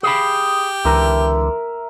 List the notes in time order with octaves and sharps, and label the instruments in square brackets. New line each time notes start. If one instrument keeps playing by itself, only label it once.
[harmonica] G4 [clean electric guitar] G#4 F5 B5
[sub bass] C#2 [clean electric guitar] D3 E3 [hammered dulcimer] A#4 E5